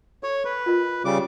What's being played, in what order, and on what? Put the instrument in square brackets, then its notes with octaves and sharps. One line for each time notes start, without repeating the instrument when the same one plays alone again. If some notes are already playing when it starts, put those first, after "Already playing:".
[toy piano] A4 [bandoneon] C#5
[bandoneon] B4
[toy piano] F4 A#4 D#5
[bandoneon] C#3 G3 D6